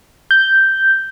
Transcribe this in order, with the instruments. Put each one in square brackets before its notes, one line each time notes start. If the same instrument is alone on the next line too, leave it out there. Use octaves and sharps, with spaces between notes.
[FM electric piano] G6